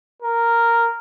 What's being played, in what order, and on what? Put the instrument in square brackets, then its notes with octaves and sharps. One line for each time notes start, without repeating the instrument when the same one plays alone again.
[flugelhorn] A#4